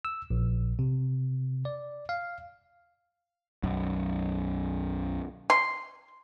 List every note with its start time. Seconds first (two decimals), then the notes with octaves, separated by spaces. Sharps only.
0.05 E6
0.30 A#1
0.79 C3
1.65 D5
2.09 F5
3.63 B1 F#2
5.50 C6